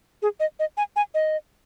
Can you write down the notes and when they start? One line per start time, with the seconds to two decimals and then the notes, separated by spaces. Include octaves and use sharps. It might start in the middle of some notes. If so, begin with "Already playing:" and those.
0.22 G#4
0.40 D#5
0.59 D#5
0.77 G#5
0.96 G#5
1.14 D#5